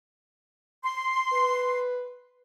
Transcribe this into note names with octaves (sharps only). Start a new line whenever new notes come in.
C6
B4